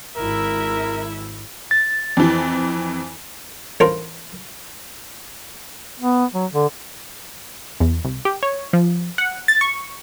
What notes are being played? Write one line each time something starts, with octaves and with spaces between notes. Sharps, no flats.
G#1 E4 A#4 E5
A6
F2 E3
A1 D4 F4 A#4 C5
B3
F#3
D3
E2
C2
G4
C#5
F3
F#5
A6
C#6